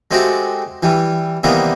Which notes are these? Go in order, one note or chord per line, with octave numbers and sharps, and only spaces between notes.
G#3 A3 C4 F#4 G4 A4
E3 G3
C3 D#3 E3 G3 A#3 B3